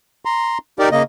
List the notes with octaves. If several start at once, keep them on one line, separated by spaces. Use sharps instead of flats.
A#5 C6
D#4 G4 A#4 D5
C#3 A#3 D#5